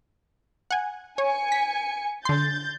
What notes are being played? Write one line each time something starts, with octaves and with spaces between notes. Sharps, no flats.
F#5 G#5
C#5 G#5 C#7
B6
D3 C6 G6 A6